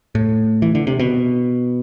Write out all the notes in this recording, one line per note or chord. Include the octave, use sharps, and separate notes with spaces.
A2
E3
D3
C3
B2